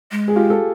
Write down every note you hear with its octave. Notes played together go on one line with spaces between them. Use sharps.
G#3
G#4
F4 G4
A4